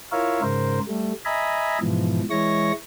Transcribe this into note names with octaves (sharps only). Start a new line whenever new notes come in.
E4 F4 A#4 C#5 E5 F5
G#2 C#3 A#4 C5
G3 A3
D#5 E5 G#5 A#5 B5
G#2 B2 E3 F3
E3 G#3 E4 C#5 C#6 A#6